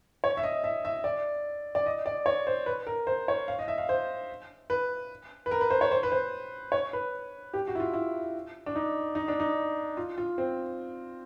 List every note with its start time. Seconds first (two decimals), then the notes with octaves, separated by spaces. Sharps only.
0.24 C#5
0.37 E5
0.43 D#5
0.64 E5
0.85 E5
1.04 D5
1.75 D5
1.86 D#5
2.06 D5
2.26 C#5
2.47 C5
2.66 B4
2.87 A#4
3.07 C5
3.28 C#5
3.48 F5
3.59 D#5
3.68 E5
3.78 F5
3.89 C5
4.70 B4
5.46 B4
5.51 A#4
5.61 B4
5.70 C5
5.81 C#5
5.91 C5
6.03 B4
6.12 C5
6.72 C#5
6.93 B4
7.54 G4
7.67 F#4
7.75 E4
7.80 F4
7.93 E4
8.66 D4
8.76 D#4
9.15 D#4
9.28 D4
9.40 D#4
9.97 F4
10.18 F4
10.38 C4